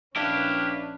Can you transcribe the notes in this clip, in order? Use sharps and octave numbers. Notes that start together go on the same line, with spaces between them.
A#1 C#4 D4 E4 G4 B4 F5